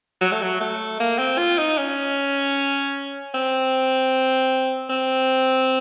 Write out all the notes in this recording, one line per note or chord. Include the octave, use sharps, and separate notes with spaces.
F#3
A3
F#3
A3
A#3
C4
F4
D#4
C#4
C4
C4